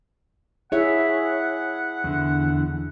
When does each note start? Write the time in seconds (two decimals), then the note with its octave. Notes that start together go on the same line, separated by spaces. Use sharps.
0.72 E4 G#4 C#5 E5 F#5
2.04 E2 D3